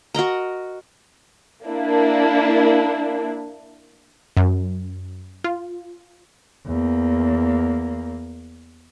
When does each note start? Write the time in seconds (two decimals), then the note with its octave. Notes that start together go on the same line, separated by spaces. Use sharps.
0.14 F#4 A#4 D#5 A#5
1.65 A#3 D4 E4
4.37 F#2
5.44 F4
6.67 E2 A#3